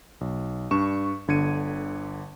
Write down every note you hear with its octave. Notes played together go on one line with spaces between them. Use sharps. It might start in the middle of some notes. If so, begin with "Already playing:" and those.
B1
G2 D4 C#6 E7
G1 D3 G#6 C#7 D#7